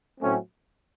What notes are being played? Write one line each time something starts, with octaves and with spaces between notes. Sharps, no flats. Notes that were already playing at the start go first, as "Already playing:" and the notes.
A2 F#3 A3 C4 C#4